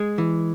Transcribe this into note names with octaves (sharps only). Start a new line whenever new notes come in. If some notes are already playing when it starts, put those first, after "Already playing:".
Already playing: G#3 G#4
E3